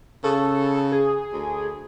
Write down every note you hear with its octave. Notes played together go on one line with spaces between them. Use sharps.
C#3 A4
G#4
D2